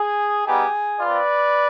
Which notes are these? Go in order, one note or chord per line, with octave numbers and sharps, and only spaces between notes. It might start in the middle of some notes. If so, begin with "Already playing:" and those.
Already playing: G#4
G3 B3 D#4 G4 G#4
C4 F4 B4 D5